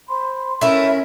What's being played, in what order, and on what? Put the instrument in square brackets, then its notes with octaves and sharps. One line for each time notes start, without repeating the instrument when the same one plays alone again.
[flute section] C5 B5 C6
[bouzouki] A3 E4 [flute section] C#4 A#4 E5